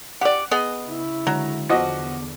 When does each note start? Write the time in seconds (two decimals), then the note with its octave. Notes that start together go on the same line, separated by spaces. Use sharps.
0.21 G4 D5 F#5
0.51 B3 G#4 D#5
0.87 C#3 E4
1.27 D3 F#3 G#3 C#5 A#5
1.69 E2 D3 F3 B3 F#4 D#5 D6